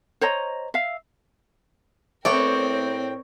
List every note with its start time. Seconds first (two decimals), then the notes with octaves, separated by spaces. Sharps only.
0.21 C5 C#5 D#5 A#5
0.74 E5 F5
2.25 A2 A3 B3 C4 A#4 C#5 D5 G5